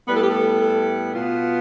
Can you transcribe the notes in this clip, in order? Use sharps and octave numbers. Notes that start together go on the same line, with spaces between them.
A2 G3 B3 B4
A4
G4
A4
A4
B2 B3 F4